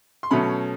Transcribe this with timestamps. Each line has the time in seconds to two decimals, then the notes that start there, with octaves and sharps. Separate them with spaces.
0.23 C6
0.31 B2 F#3 A3 C#4 B5